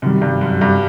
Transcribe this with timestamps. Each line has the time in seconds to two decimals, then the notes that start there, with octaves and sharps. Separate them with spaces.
0.02 F#2 C3 D#3 G3
0.22 G2
0.41 F#2
0.61 G2